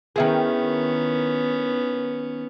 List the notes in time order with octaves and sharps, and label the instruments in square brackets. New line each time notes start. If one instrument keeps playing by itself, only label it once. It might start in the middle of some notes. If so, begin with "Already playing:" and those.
[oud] D#3 E4 G#4 [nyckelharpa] B3 C#4